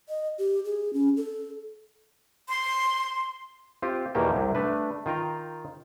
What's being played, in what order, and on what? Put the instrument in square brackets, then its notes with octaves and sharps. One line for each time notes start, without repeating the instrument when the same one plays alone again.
[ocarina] D#5
G4
G#4
C#4
A4
[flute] C6
[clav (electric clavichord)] C4 F4 G4
E2 B2 D#3 A#3 G4 G5
C2 C3
A3 D4 B4
D#3 F4 G5 A#5